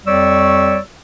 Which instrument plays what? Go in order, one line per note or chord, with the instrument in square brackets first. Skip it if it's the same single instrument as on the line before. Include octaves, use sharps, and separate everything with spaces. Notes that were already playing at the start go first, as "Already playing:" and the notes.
[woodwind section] F2 G3 C#5 D5 C#6 E6